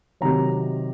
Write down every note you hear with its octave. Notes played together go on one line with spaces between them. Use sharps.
C3 D#3 F#3 A#5